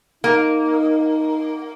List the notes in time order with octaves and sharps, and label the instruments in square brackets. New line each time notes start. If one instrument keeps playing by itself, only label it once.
[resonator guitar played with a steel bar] A#3 [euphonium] D#4